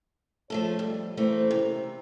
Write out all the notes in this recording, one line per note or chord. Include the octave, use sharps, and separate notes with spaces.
F3 A3 A4 C#5
F2 G3
C#3 E3 A3 C4 A#4 C5
C3